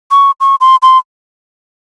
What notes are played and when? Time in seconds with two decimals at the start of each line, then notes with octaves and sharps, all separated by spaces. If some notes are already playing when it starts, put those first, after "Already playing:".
0.11 C#6
0.40 C#6
0.61 C6
0.82 C6